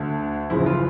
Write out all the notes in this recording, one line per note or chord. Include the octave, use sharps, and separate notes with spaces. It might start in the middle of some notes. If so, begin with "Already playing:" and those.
Already playing: D2 D3
F#1 F2 C#3 E3 E4
F4